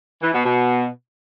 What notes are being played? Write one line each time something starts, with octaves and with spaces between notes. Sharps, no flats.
E3
B2
B2